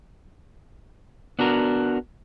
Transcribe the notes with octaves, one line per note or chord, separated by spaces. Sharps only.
B3 D4 F#4 A#4